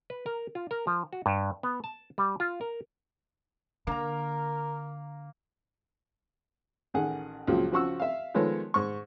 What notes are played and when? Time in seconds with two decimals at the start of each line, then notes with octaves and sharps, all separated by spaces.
0.10 B4
0.26 A#4
0.55 F4
0.71 A#4
0.87 F3
1.13 F#4
1.26 G2
1.63 B3
1.84 A5
2.18 G3
2.40 F4
2.61 A#4
3.87 D3 A#3 A#4 A#5
6.94 A1 D#3 G#4 F#5
7.47 C#2 A#2 F3 F#3
7.72 C#3 F3 F#4 F#5 C#6 E6
8.00 E5 F5
8.34 D#3 F3 G#3 B3 A4 C#5
8.74 G#2 C#6